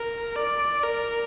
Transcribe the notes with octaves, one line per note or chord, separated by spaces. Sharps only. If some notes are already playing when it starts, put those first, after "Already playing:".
Already playing: A#4
D5
A#4